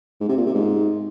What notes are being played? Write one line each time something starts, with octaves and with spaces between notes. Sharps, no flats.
G#2
C3
A#2
C3
G#2